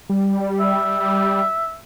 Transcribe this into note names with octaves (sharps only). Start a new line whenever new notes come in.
G3
E5